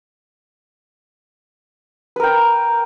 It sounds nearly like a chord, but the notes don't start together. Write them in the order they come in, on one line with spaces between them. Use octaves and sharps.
B4 A#4 G5